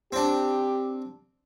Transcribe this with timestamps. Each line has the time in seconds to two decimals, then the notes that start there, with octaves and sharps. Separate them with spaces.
0.13 C4 D4 G4